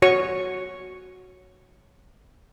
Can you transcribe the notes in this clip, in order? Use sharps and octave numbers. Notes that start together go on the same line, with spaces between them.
F#4 C#5 C#6